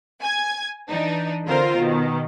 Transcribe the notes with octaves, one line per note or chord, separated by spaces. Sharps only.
G#5 G#6
E3 D4 D#4
D3 C4 F4 A#4 C5
B2 D#3